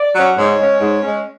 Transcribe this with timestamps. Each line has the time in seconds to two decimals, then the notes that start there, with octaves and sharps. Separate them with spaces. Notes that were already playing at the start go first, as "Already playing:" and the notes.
Already playing: D5
0.14 F#3 C#4
0.36 G#2 C#5
0.58 G#3 C#4
0.81 G#2
1.02 G#3 C#4